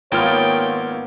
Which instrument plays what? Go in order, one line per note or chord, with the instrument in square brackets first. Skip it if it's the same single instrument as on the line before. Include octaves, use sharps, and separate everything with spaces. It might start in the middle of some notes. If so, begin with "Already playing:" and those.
[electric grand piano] G#1 F4 F6 [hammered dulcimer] A#3 B3 [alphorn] C#5 [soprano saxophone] G5